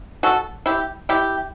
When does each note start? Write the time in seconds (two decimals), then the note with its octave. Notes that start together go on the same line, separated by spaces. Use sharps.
0.23 F#4 A4
0.66 E4 G4
1.09 E4 G4